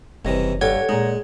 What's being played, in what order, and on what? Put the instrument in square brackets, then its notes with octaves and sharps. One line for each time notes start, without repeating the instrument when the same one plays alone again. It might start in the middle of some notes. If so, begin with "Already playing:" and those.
[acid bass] F#1 [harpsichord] C2 C3 E3 [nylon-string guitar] C#5 D#5
[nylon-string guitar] G2 A4 [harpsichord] G4 [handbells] C#5 F#5 G#6
[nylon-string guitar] A#2 D#4 [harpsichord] G#3 [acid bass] G#4